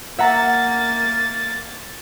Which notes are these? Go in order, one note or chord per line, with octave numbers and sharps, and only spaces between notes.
A#3 E5 F#5 A#5 A6